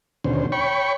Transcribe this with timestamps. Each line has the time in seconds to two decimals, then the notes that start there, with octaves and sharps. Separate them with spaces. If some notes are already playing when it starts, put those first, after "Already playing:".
0.24 D#2 B2 D3 C#4 C5
0.52 C#5 G5 B5 C#6